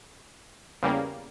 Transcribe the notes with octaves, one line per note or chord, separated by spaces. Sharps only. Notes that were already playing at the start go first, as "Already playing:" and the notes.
E2 C#3 G3 A#3